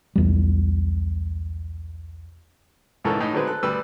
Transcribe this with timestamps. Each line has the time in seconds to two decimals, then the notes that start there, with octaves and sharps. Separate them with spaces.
0.16 B1 E2 G3
3.04 C#2 G#2 E3 A4 A#4 C#5
3.20 A2 D#4
3.33 D3 F#3 G#3 C4 B4
3.47 A4 F#6
3.63 D2 G3 B4 E6